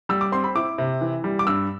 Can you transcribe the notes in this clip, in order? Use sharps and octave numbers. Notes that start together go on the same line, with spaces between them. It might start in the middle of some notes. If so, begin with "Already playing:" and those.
G3 E6
D6
C4 C6
B5
E4 D6
C3
E3
G3
D6
G2 E6